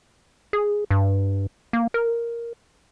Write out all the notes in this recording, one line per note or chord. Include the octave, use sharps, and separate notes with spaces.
G#4
G2
A#3
A#4